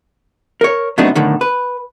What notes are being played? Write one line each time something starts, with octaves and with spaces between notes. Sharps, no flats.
A#4 C#5
C3 F#3 A3 B3 D4 D#4
B1 A2 D3 D#3
B4